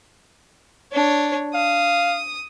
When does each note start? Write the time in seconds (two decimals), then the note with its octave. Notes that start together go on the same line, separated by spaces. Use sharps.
0.93 D4 C#5
1.55 F5 D#6